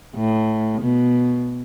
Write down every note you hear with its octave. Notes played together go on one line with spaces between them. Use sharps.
A2
B2